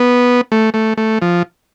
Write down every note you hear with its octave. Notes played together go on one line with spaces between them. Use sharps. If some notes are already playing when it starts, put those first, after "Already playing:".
Already playing: B3
A3
A3
A3
F3